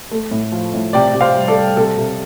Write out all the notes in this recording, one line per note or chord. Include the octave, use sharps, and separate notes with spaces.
A3
A2
F3
A2
C3 D5 G5
C3
C5 F5
G3
A4 D5
G3
C3 A4
C3